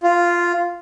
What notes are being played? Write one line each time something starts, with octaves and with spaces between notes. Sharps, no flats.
F4